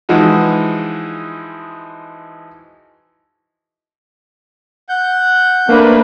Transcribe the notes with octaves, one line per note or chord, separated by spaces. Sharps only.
E3 F3 G#3 D#4 F#4
F#5 G6
A3 A#3 D4 B4 C5